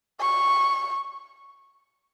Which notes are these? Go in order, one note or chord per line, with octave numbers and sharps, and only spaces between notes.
C#6